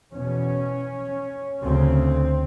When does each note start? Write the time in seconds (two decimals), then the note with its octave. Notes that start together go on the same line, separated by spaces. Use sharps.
0.12 E2 B2 C#4
1.63 D2 C#3 C4